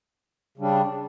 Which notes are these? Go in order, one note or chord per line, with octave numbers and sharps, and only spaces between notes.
C#3 G3 D4